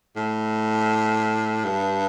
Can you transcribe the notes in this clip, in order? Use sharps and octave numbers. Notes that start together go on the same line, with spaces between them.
A2
G2